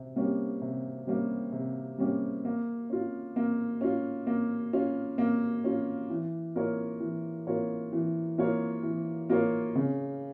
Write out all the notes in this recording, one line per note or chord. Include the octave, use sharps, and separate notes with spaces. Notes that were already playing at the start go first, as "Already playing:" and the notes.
Already playing: C3
G3 A#3 C#4 G4
C3
G3 A#3 C#4 G4
C3
G3 A#3 C#4 G4
A#3
C#4 F4
A#3
C#4 F4
A#3
C#4 F4
A#3
C#4 F4
E3
A#3 F4 A#4 C#5
E3
A#3 F4 A#4 C#5
E3
A#3 F4 A#4 C#5
E3
A#3 F4 A#4 C#5
C#3